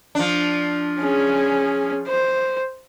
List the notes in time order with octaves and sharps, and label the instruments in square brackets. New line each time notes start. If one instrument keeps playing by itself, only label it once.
[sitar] F3 D4
[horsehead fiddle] C#4 G#4
C5